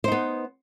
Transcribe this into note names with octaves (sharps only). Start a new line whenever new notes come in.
B3 D#4 C5